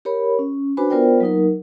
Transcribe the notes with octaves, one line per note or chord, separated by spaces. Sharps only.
G4 A#4 C#5 B5
C#4
D4 F#4 B4 C5 G#5 B5
B3 F4 A#4 C5 D5 G5
F#3 A#3 D#4 A#4